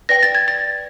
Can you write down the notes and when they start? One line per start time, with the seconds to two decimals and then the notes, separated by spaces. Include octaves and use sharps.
0.09 B4 D5 G5 A#6
0.23 A6
0.35 G#6
0.48 A6